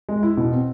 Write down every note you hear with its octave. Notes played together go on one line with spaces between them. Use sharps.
G#3
E4
B2
C4